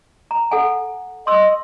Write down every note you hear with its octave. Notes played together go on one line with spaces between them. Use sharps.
A#5
A4 F#5 G#5
D#5 C6 E6